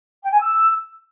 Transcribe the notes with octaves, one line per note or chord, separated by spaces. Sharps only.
G5
G#5
E6